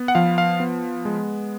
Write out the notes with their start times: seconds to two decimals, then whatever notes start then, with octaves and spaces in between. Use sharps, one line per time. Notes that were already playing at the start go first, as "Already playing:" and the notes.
Already playing: B3
0.08 F#5
0.15 F3 F5
0.38 F5
0.60 B3
1.05 G#3